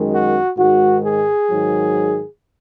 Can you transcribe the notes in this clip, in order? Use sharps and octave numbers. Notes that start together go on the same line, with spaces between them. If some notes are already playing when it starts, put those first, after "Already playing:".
Already playing: F#2 D#3 G#3
F#4
G#2 D#3 G#3 F#4
G#4
G#2 D#3 F#3